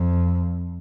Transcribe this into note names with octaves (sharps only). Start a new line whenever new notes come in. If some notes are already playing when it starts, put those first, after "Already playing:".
Already playing: F2